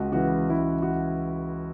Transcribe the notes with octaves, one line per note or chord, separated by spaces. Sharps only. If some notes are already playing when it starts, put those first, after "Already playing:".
Already playing: C#2 F#4
C#3 E3 F#4
C#2 E4
F#4